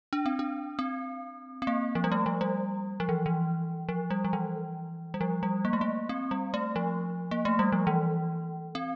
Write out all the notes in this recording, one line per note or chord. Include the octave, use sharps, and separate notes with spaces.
D4
C4
D4
C4
C4
A#3
F3
G3
A3
F3
G3
F3
E3
E3
F3
G3
F3
E3
G3
F3
G3
A#3
A3
A#3
C4
G3
A3
F3
A#3
A3
G3
F3
E3
C4